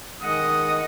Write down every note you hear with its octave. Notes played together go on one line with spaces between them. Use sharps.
D#3 G#3 D#5 F#5 D#6